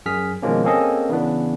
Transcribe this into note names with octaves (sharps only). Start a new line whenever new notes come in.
F#2 G#4 F6 B6
B2 D#3 F3 G#3 A#3 C#4
A#3 C4 C#4 G#4 A4 D#5
C#3 E3 B3 D4